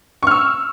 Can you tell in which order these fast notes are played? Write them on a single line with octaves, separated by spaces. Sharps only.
C#6 F6 E6